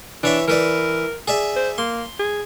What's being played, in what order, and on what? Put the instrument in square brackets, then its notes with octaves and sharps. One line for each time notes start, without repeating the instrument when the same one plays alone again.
[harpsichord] E3 C#5 E5 [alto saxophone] D4
[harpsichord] E3 B4 D5 [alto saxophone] A#4
[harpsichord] G#4 D5 E5
[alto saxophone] C5
[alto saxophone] A#3 [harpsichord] C6
[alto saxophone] G#4